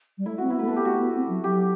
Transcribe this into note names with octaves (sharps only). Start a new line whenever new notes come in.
G3
A3 E4
C4 F#4
B3 E4
A3 B4
B3 A4
G4
A3 F#4
B3
C4
F#3
F#3 G4